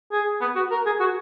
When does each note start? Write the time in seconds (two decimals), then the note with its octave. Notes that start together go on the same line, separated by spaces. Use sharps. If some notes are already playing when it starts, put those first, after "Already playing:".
0.12 G#4
0.41 B3
0.55 F#4
0.71 A#4
0.86 G#4
1.00 F#4